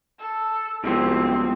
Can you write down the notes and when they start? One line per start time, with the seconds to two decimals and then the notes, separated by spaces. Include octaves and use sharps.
0.19 A4
0.84 C2 G#2 B2 F3 C4